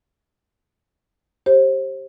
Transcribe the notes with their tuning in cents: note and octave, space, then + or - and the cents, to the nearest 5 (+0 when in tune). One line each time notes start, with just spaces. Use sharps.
G4 -5 C5 +30